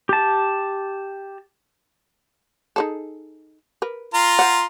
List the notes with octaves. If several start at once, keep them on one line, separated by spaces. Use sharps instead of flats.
G4 A5
D#4 G#4 A4
A#4 B4
F4 A#5 C6
C5 F#5